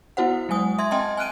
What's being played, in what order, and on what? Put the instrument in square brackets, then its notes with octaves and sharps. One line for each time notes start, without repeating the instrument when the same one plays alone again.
[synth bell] B3 E4 F#4 C5 F#5
F#3 G#3 G#5 D#6
E5 C6 G#6
C4 D#5 G5 A5 C6
G#5 F6 F#6 D7 D#7